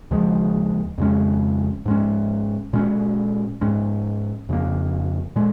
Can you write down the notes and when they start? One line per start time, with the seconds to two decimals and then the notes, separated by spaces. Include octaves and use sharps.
0.11 D#2 C#3 F3 G#3
0.98 F2 C#3 G#3 C#4
1.86 G#2 G#3 C#4
2.73 A#2 G#3 C#4
3.61 G#2 G#3 C#4
4.49 F2 C#3 A#3
5.36 A#2 G#3